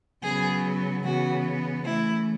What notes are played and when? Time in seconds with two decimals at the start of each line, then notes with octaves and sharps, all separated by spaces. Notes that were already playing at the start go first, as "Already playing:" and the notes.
0.22 C#3 F#3 B3 G#4
1.04 C#3 E3 B3 F#4
1.86 C#3 E3 A3 E4